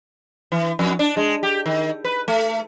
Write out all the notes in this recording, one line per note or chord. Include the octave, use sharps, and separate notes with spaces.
E3
F2
D4
G#3
G4
D#3
B4
A3